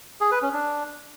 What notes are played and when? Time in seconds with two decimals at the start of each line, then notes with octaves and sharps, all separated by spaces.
0.21 G#4
0.31 B4
0.42 C#4
0.53 D4